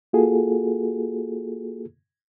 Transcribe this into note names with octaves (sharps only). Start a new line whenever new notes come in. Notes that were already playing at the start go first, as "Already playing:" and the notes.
A#3 F4 F#4 G#4 A4